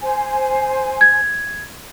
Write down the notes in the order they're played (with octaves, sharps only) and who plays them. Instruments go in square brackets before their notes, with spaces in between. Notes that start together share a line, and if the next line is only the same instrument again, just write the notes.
[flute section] C5 G#5
[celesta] G#6